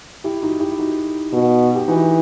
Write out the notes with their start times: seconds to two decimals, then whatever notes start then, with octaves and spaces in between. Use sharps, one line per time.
0.24 E4 G4
0.42 D#4 F#4
0.60 E4 G4
0.78 D#4 F#4
1.33 B2
1.75 G4
1.88 E3 D#4 F#4